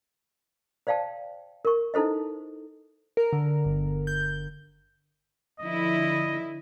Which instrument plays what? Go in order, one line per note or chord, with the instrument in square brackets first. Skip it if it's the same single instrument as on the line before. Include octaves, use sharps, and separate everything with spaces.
[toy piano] C5 D5 F5 G5 A5
A#4 C#6
D#4 E4 A4 C5 D#5
[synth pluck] A#4
D3
G1
G6
[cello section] D3 F3 E4 [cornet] D#5